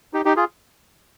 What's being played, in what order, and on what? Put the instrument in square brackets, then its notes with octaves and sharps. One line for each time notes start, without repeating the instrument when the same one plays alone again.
[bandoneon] D#4 G4
D#4 G4
F4 G#4